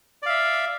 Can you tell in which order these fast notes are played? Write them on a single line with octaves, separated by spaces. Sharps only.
D5 F5 E5